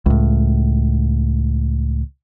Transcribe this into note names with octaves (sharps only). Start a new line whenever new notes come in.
C#2 A2